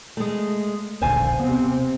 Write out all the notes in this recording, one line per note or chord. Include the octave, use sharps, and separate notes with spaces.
G#3 A3
D#1 A#1 D3 C5 F5 G#5
C3 B3 C4